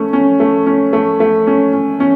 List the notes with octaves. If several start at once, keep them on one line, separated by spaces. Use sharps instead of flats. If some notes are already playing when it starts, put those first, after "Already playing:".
Already playing: A3 C#4
C#4
A3
C#4
A3
A3
C#4
C#4
C#4